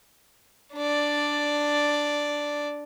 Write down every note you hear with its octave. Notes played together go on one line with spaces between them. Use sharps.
D4 D5